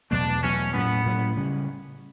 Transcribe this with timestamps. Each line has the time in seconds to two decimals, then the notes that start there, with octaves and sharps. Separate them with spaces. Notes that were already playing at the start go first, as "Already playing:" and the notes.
0.10 E2 B2 F#3 A3 D4
0.42 E2 B2 F#3 A3 C#4
0.73 A2 F#3 B3 C#4
1.06 A2 F#3 C#4
1.37 C#3 G3 C#4